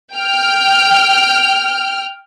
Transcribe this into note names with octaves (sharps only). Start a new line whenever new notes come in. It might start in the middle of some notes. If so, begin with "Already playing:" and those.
G5 F6